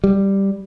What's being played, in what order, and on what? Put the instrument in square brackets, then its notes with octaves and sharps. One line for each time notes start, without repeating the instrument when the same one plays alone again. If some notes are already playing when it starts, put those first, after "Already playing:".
[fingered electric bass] G3